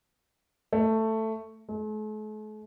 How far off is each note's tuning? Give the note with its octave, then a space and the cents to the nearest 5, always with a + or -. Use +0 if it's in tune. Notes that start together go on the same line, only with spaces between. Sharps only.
A3 +10
A3 -45